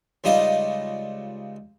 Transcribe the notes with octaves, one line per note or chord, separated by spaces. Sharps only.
C#2 C#3 G3 D#4 F4 D#5